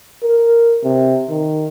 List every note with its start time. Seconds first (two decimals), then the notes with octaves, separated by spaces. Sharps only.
0.23 A#4
0.83 C3
1.30 D#3